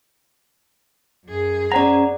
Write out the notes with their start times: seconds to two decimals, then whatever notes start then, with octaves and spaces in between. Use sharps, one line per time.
1.26 F#2 G#4
1.72 C#4 C5 D5 F#5 A#5